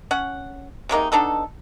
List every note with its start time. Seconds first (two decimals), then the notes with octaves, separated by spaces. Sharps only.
0.11 C#4 F#5
0.89 C3 G#3 A#3 D#4
1.12 B3 D4 D#4 A4